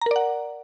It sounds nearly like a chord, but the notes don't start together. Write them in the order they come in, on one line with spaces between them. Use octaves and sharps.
A#5 A#4 D5 F#5